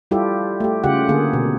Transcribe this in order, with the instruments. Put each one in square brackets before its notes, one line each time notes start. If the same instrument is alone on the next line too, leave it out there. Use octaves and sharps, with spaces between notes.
[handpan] G3 E4 F4 G4 A4
A3 G4
C#3 F4 G4 F#5
D3 A#3 G#4
B2